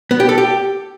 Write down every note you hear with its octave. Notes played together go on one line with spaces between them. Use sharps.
B3
G4
A4
G4